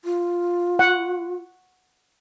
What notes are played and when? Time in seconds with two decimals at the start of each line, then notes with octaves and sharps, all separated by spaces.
0.05 F4
0.79 F#5